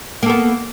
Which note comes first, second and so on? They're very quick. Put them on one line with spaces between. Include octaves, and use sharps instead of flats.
A#3 A4 B3